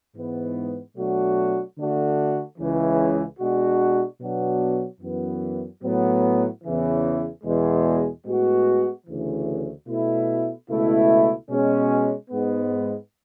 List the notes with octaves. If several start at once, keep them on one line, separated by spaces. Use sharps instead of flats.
G#2 E3 B3
B2 F#3 A3 D4 F#4
D3 A3 D4 F#4
C#2 C#3 E3
B2 G#3 D4 F#4
B2 F#3 B3 D4 F#4
F#2 E3 B3
A2 F#3 B3
E2 C#3 E3
E2 B2 G#3
A2 G#3 B3 F#4
D2 C#3 E3
B2 A3 E4
C#2 B2 A3 E4
B2 G#3 C#4
G#2 G#3 B3